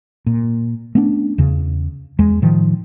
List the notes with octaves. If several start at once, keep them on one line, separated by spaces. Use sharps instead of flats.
A#2
A3 B3 C#4 D4
E2 C#3
E2 G#3
A2 D#3 F3